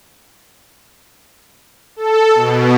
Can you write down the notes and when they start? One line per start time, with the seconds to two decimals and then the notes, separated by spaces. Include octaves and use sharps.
1.96 A4
2.35 B2